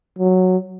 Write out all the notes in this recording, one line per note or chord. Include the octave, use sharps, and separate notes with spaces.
F#3